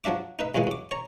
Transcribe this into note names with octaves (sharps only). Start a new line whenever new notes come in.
F3 F#3 D4 E5 D6
D#4 B4 E5
A#1 F#2 A#2 E3 G#3
F#2 D6
C#5 A#5